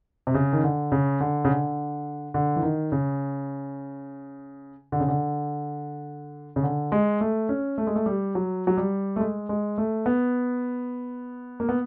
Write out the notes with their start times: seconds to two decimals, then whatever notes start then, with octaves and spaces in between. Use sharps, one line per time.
0.27 C3
0.34 C#3
0.53 D#3
0.64 D3
0.92 C#3
1.20 D3
1.45 C#3
1.49 D3
2.34 D3
2.56 E3
2.63 D#3
2.92 C#3
4.92 D3
5.00 C#3
5.08 D3
6.56 C#3
6.63 D3
6.92 G#3
7.21 A3
7.49 C#4
7.78 A3
7.87 G#3
7.95 A3
8.06 G3
8.35 F#3
8.67 F#3
8.77 G3
9.16 A3
9.20 G#3
9.49 G#3
9.78 A3
10.06 B3
11.60 A#3
11.69 B3